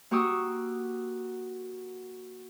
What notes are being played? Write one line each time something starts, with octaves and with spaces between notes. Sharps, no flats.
A#3 F#4 G4 C#6 D#6 E6